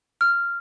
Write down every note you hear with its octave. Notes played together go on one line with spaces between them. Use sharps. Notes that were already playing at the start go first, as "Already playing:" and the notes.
F6